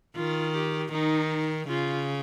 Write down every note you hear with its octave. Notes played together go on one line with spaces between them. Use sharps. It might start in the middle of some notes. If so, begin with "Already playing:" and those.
D#3 F4
G4
D#3 D#4
C#3 F4